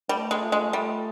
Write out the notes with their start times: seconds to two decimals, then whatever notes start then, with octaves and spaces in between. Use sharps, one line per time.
0.09 G3 A3
0.31 G#3
0.42 F4
0.52 G#3
0.73 G3 A3